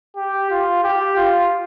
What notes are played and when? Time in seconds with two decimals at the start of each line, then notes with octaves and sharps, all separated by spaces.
0.16 G4
0.51 F4
0.84 G4
1.16 F4